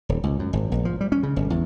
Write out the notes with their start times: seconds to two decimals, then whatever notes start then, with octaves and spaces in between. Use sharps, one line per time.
0.09 D#1
0.23 C#2
0.39 F#2
0.53 G#1
0.72 A#1
0.85 F3
1.01 G3
1.12 C#4
1.23 C#3
1.36 G1
1.50 E2